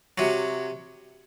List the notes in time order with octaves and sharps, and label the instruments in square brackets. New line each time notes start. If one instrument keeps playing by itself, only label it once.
[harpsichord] C3 F#3